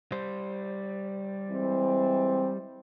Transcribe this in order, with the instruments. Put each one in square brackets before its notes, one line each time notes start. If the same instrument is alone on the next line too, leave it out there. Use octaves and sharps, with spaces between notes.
[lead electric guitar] G3 C5
[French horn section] E3 G#3 C4